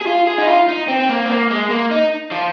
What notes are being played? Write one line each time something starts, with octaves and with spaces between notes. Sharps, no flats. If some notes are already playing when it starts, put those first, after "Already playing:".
G#4
F4
G#4
D#4
F4
D#4
C4
C4
A#3
C4
A#3
G#3
A#3
D#4
F3